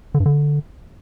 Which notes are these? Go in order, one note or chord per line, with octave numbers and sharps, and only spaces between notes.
D3
G2
D3